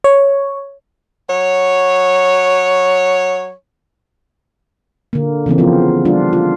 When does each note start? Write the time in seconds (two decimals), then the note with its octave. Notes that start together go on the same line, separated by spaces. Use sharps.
0.04 C#5
1.29 F#3 C#5
5.13 D3 A#3
5.46 C#3 E3 A#3 C4
5.58 F3 B3 C4 F4
6.05 G3 D4 F4
6.33 F4